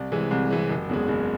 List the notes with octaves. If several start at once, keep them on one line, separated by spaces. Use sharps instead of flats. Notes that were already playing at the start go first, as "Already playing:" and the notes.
Already playing: C2
C3 E3 G#3
C2
C3 E3 G#3
F#1
E2 C#3 G#3
F#1